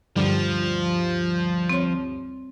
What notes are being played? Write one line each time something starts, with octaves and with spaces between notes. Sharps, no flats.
D2 G2 F3 G3
C4 C#5